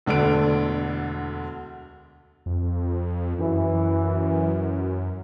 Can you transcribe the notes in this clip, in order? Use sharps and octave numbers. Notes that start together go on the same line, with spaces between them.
E1 D2 D3 A3 D7
F2
F#2 E3